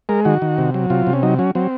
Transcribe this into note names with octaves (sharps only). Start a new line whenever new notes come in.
G#3 A#4
D#3 F#4
D#3
C3
F#3
C3 F4
C3
C#4
F#3 D#4
F#3 C#4
F#3 C4